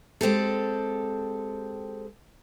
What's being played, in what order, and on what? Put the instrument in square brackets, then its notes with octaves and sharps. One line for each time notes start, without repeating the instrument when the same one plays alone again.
[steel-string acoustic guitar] G#3 C4 G4 A4